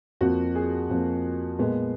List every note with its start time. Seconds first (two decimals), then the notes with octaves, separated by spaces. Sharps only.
0.21 F2 F3 A#3 F#4
0.55 G#4
0.90 F2 F3 A#3
1.59 A#2 G#3 B3